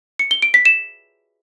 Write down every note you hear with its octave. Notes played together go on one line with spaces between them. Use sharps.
C#7
G7
D7
B6
E7